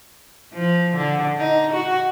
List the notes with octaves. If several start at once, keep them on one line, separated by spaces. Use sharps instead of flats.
F3
D3
D#4
F#4